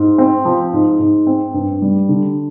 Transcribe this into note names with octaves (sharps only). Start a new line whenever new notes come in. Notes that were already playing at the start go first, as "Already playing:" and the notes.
Already playing: G#2
C4
F3
G#2
G#2
C4
G2
G3
D3